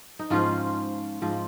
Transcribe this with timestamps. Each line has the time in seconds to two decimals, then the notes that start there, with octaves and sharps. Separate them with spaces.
0.19 D#4
0.30 G#2 F3 C#4 F4
1.22 G#2 F3